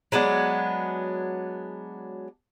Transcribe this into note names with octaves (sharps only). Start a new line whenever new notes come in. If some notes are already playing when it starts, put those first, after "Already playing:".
F#3 G#3 B3 D4